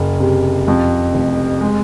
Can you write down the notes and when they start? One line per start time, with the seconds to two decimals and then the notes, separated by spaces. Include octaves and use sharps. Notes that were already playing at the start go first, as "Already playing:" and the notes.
Already playing: F#1
0.20 C3
0.68 F2
1.14 F1
1.61 G#3